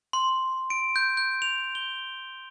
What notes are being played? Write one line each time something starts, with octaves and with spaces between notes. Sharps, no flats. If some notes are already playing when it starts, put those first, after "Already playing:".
C6
D7
G6
G6
F7
G7